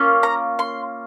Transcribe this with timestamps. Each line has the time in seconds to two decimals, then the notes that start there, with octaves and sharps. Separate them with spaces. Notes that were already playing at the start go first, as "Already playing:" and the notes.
Already playing: A#3 C#4 F4
0.23 A#5
0.59 C6